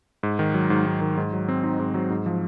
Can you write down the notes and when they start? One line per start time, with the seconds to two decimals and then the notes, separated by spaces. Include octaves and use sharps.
0.23 G#2
0.39 D#3
0.54 F#3
0.70 G#2
0.86 G#2
1.01 D#3
1.17 G#2
1.33 F#3
1.49 C4
1.64 D#4
1.79 G#2
1.94 F#3
2.10 G#2
2.26 F3